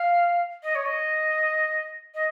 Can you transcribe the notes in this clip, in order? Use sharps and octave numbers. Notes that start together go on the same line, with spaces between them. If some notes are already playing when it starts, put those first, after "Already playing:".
Already playing: F5
D#5
C#5
D#5
D#5